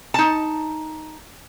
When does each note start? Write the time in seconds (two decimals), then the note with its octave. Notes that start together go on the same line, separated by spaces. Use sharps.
0.14 D#4 A5